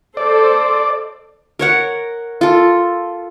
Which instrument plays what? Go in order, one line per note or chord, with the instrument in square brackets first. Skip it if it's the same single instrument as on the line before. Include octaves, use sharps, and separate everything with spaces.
[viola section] A4 C5 [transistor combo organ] D5
[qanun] A#4 C#5 F#5
F4 A4